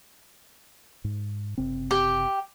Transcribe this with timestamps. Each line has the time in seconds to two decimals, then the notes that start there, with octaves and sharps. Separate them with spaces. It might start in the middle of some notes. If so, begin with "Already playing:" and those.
1.04 G#2
1.58 F#1 C3 C4
1.91 G4 G5